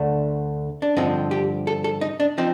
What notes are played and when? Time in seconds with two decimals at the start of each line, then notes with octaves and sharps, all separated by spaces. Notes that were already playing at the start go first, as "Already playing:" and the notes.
Already playing: D2 D3 A3 D4
0.82 D4
0.97 G2 D3 F3 C4 D#4
1.31 G4
1.67 A4
1.84 A4
2.01 D#4
2.20 D4
2.38 F3 C4 D#4